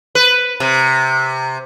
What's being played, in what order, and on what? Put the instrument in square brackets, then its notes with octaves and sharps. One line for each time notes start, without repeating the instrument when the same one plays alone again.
[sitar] B4
C3